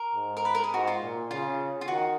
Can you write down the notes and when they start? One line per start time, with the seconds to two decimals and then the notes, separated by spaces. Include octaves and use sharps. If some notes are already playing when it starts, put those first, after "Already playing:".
Already playing: A#4
0.15 G#2
0.37 A#4
0.45 B4
0.55 A#4
0.64 G#4
0.73 G#2 F#4
0.87 F4
1.02 A#2
1.31 C#3 F4
1.81 F4
1.88 D#3 F#4